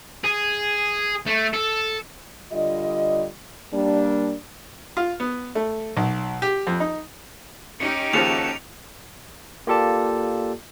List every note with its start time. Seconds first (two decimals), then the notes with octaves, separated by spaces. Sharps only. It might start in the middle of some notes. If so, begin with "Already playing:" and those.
0.24 G#4
1.27 A3
1.54 A4
2.53 D3 G3 F4 D#5
3.73 G3 A#3 D4
4.97 F4
5.20 B3
5.55 A3
5.97 B1
6.42 G4
6.67 F2
6.80 D#4
7.80 C#4 D#4 G4 C#7
8.13 D#2 C#3 F3 A#3 F#4 A4 F7
9.67 A#3 F4 G4 A4 D5 A5